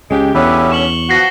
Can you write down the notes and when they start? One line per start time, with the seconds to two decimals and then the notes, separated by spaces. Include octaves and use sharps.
0.11 C#2 C#3 G#3 G4
0.35 E2 B2 D3 C#4 G4 B4 E5
0.72 C#6 E7 F#7 G7
1.09 F3 B3 F#4 A#6 C7 C#7